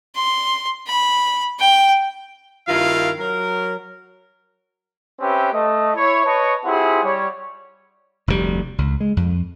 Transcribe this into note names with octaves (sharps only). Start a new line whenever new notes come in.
C6
B5
G5
G2 D#3 E4 F4 A#4 F5
F#3 A#4
C4 C#4 G4 B4 E5 G5
A3 D#5
E4 C#5
B4 C#5 D#5 A5 C#6
C4 E4 F4 G4 G#4 F#5
G3 C#5
F1 D2 G#2 G3
C#2
G#3
F2